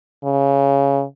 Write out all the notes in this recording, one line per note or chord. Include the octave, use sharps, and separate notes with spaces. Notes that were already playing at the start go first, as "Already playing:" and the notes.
C#3